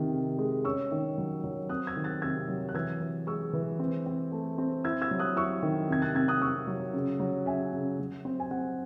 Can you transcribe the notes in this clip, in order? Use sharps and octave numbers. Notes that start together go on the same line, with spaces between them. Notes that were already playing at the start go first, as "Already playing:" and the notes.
Already playing: C3 D#3
C3
G#3
C#4 C#6 E6
D#3
F#3
F#3
C4 D#6 F#6
E6 G#6
D#3
F#6 A6
C3 E6 G#6
F#3
F#6
E3 E6 G#6
E3
G#3 C#6 E6
E3
C4
C4
A3
C4
E4 E6 G#6
E6 G#6
F#3
D#6 F#6
E4 C#6 E6
D#3
C3 G#6
F#6 A6
C3 E6 G#6
D#6 F#6
C3 C#6 E6
F#3
C#3
F#3
C#3 E5 G#5
C#3
F#3
C4
G#5
C4 F#5